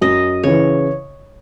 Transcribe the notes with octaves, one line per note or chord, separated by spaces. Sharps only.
F#2 D#5
C#3 E3 C#5